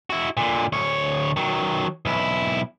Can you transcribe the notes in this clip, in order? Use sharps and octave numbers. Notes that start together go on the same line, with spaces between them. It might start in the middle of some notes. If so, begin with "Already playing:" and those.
E4 F#4
A#2 D3
D2 C#5
D#3 F#3
B1 E4